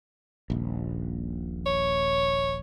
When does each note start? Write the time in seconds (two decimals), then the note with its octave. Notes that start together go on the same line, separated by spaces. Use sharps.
0.50 D#1 A#1
1.66 C#5